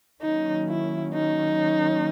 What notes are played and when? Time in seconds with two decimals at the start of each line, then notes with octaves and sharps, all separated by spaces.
0.22 D#3 F#3 A#3 C#4 D#4
0.68 E4
1.14 D#4